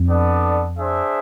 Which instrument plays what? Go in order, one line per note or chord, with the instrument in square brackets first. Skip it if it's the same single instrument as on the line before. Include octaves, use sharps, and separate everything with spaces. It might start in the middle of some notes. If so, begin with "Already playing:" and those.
Already playing: [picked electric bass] F2
[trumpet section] B3 D4 A4 D5
D4 G#4 C5 E5